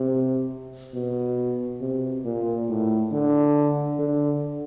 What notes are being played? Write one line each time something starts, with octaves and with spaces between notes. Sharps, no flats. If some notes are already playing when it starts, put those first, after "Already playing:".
Already playing: C3
B2
C3
A#2
A2
D3
D3